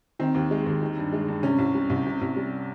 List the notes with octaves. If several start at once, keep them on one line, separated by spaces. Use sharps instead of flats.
D#3 C4
D#2
G#3
D#2
D#3
G2
G#3
G2
C3 C#4
C2
G3
C2
C3
C2
G3